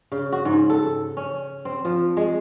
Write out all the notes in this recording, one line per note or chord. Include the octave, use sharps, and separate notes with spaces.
C#3
F#4
G#2
A4
C#4
C4
F3
G#3